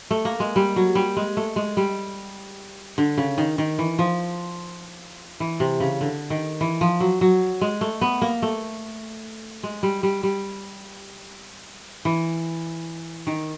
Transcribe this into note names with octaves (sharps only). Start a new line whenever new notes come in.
A3
A#3
G#3
G3
F#3
G3
G#3
A3
G#3
G3
D3
C#3
D#3
D#3
E3
F3
E3
C3
C#3
D3
D#3
E3
F3
F#3
F#3
G#3
A3
B3
A#3
A3
G#3
G3
G3
G3
E3
D#3